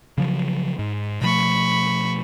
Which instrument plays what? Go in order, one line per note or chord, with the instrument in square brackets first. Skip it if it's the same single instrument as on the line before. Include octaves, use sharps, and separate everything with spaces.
[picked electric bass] C#3 F3 F#3
G#2
[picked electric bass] B2 F3 A3 [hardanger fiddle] B5 C#6